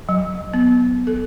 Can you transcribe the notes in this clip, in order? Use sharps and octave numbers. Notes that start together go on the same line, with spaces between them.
F#3
B3
A4